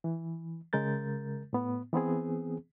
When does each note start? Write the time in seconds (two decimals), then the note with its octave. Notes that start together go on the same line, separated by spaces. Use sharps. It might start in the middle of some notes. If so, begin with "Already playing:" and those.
0.04 E3
0.73 C#3 G#3 A#4 G6 A6
1.53 A2 B3
1.93 E3 B3 C4 G#4